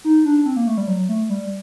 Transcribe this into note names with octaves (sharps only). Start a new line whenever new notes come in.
D#4
D4
C4
A#3
A3
G3
F#3
A3
G3